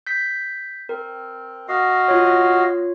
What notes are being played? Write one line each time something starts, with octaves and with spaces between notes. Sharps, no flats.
G6 B6
C4 A#4
F#4 D#5 F5
F4 C#5